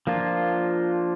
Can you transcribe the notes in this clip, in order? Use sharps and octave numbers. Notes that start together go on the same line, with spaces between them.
F3 A#3 D4 F4